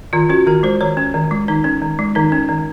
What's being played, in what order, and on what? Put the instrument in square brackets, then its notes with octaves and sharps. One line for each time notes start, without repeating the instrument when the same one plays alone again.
[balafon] D#3 F4
C#4 F#4
D#3 A#4
G#3 C5
D#3 C#5
C#4
D#3
G#3
D#3 D#4
C#4
D#3
G#3
D#3 D#4
C#4
D#3